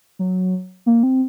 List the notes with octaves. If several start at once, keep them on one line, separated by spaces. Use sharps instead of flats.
F#3
A#3
C4